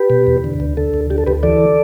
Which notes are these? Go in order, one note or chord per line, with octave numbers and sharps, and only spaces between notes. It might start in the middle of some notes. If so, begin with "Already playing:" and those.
Already playing: G4 B4
B2
E2
D3
D2
D3 A4
D2
D3 G4
A4
D2 G4 B4
E3 A4 D5